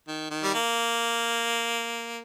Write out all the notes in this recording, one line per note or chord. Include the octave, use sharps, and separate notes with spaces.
D#3
D#3
G3
A#3